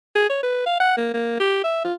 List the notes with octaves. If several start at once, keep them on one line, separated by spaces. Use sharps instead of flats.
G#4
C#5
B4
F5
F#5
A#3
A#3
G4
E5
F4